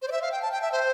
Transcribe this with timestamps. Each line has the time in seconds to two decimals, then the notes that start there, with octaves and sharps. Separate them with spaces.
0.02 C5
0.08 D5
0.12 E5
0.22 F5
0.31 G5
0.42 A5
0.52 G5
0.61 E5
0.72 C5